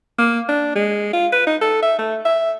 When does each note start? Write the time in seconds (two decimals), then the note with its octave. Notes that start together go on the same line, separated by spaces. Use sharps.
0.18 A#3
0.49 D4
0.75 G#3
1.13 F4
1.32 B4
1.47 D#4
1.61 A4
1.82 E5
1.99 A3
2.25 E5